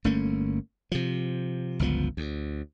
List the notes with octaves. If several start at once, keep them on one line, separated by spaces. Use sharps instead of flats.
G1 A3 A#3 C#4
C3 F3
G1 C#2 F3 B3
D2